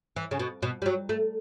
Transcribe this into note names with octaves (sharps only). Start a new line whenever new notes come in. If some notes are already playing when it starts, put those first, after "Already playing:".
E3
C#3
B2
B2
G3
F#3
A3